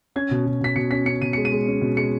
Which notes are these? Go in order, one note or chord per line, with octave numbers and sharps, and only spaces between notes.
C#4 G#6
B2
B2
B2 B6
B2 C#7
C#4 B6
C#4 C#7
B2 D#7
G#3 C#7
D#7
G#3
C#4
B2
G#3 C#7